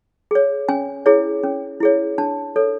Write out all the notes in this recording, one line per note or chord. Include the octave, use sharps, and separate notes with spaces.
G#4 C#5
C#4 G#5
E4 G#4 C#5
C#4
E4 G#4 C#5
D4 A5
A4 C#5